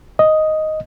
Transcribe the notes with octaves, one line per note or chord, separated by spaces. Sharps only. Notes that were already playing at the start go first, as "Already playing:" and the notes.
D#5